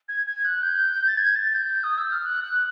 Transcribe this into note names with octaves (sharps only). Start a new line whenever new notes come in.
G#6
G#6
F#6
G6
A6
G#6
A6
G6
D#6
E6
F6
F#6
F#6